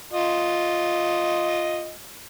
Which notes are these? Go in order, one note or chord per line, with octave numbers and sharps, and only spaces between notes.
F4 D#5